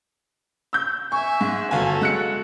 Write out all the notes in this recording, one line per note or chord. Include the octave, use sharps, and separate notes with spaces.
E6 G6
E5 G#5 C#6
G#2
G1 F#4 A4 F5 G#5
G#3 F#6 C#7